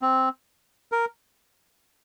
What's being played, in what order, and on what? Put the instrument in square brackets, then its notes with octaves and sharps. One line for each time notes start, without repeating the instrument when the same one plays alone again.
[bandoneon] C4
A#4